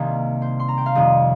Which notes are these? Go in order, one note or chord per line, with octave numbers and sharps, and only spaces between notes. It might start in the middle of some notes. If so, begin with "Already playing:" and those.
Already playing: C2 C3 D#3 A#3
C5
C6
A#5
G5
F5
F2 C3 D#3 G3 C4 D#5